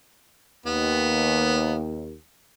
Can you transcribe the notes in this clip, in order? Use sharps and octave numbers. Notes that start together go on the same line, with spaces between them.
D#2 B3